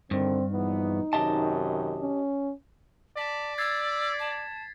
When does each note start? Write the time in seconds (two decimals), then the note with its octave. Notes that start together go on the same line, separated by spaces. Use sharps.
0.11 G2 D3 D#3 C4
0.52 A#1 E3 B3 D#4
1.13 F#2 C3 D#3 G4 D#5 A5
2.01 C#4
3.17 D5 A5 B6
3.58 E6 G#6 A6 C7
4.19 A5